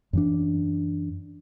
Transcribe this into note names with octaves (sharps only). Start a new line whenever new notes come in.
F#2 E3 D4